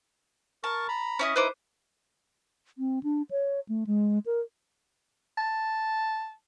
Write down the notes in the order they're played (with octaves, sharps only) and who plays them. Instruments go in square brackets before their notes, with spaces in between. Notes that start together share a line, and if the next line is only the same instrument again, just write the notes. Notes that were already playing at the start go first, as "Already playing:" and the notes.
[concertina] A#4 C#6 [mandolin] A5
[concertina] A#5 B5
[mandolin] C#4 E4 D#5
[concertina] D#4 E4 [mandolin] B4 C5 D6
[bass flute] C4
D4
C#5
A3
G#3
A#4
[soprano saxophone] A5